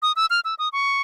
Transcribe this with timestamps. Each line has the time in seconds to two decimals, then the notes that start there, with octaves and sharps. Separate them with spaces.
0.02 D#6
0.16 E6
0.30 F6
0.45 E6
0.59 D#6
0.73 C#6